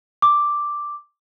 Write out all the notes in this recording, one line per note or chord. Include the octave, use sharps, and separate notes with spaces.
D6